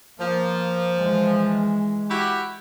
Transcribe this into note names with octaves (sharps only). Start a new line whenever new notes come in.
F3 A#3
E3 G#3
E4 F#4 G4